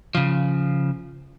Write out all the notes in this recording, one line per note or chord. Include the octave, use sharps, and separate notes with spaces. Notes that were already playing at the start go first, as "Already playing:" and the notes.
C#3 F3